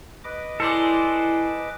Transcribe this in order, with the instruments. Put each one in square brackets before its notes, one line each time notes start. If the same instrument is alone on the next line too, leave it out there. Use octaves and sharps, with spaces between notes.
[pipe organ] B4 D#5 D6
[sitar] G#3 [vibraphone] E4 [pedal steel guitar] A4 C5 D5